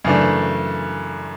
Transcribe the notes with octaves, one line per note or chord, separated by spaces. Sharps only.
F#2 C#3 E3 A3 D4